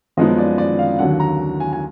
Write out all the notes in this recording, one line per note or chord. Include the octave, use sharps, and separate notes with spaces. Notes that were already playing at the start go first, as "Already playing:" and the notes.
F#2 F3 G#3 B3 D#4 D#5
D5
D5
F5
D#2 D3 F#3 F#5
A#5
G#5
G#5